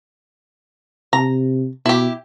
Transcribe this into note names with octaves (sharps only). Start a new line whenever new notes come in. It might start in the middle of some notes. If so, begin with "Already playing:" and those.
C3 A#5
B2 E4 G4